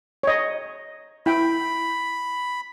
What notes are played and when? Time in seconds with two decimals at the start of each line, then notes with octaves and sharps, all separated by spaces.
0.23 C#5 D#5
1.26 E4 G5 B5